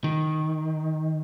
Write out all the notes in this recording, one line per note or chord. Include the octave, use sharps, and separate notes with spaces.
D#3